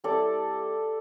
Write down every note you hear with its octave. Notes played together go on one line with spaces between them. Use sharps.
G3 C4 E4 A4 D5